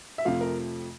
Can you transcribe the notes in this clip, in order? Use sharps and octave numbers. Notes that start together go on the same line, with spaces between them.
E5
F2 C3 F3 A3 F5
A#4